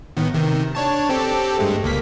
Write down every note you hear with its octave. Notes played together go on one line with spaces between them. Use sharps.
A2 D#3 B3
C3 D#3
D4 C#5 A5
C4 G4 A4
G2 G#3 A3
C#2 A#3 B6